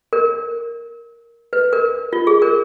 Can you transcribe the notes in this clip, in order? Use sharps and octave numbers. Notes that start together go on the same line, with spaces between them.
A#4
B4
A#4
F4
G#4
A#4